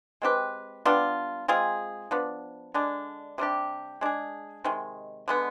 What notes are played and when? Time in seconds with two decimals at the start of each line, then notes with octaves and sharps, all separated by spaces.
0.22 G#3 C4 G4 B4
0.85 G3 B3 D4 F4
1.48 G#3 C4 F4 G#4
2.11 F3 B3 D4
2.74 D3 G#3 D4
3.38 C3 G3 D4 G4
4.01 G#3 D4 G#4
4.64 C3 D#3 G#3
5.28 D3 G#3 B3